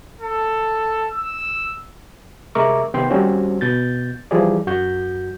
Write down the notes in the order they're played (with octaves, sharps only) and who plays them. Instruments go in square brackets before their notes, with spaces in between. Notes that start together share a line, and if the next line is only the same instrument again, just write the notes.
[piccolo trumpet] A4
E6
[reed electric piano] C3 G#3 A#4 E5 C#6 D6
C3 D#3 B3 G5 C6
D#2 G3 C4 C#4 F#4 C5
B2 G6 A6
E3 F3 G3 G#4 D5
F#2 F#4 G6